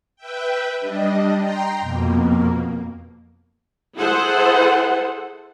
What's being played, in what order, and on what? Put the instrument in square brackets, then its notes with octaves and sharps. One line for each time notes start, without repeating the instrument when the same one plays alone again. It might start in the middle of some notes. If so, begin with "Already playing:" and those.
[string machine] B4 E5 G5
G3 D4 D#5
G5 A#5 C6
F2 B2 A#3
[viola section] E4 G#4 A4 C5 F#5